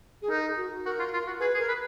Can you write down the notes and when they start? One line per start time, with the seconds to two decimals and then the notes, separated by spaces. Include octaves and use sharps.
0.22 G#4
0.30 D#4 A#4
0.57 F#4
0.85 F#4 A#4
0.99 F4
1.13 F4
1.27 F#4
1.40 G#4 B4
1.54 G#4
1.59 A#4
1.68 B4